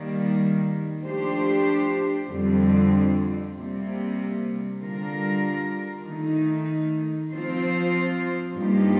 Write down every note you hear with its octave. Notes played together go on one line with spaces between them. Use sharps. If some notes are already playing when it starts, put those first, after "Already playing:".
Already playing: D#3 G3 A#3
F3 A3 D4 G4 C5
F2 D3 G3 C4
C3 G3 A#3
D3 G3 D4 F4 A#4
D#3 A3 D#4
F3 C4 F4 C5
G2 F3 A#3 D#4 G4